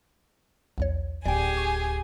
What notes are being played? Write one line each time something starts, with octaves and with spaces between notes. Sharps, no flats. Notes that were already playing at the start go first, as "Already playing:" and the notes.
B1 E2 C#5
D1 G4 G#4 D5 G5 G#5
C#6